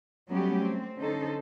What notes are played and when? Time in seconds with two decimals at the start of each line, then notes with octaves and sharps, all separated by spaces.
0.30 F#3 G3 A3 B3 C#4 G4
0.65 C4
0.99 D3 C#4 D#4 A4 C5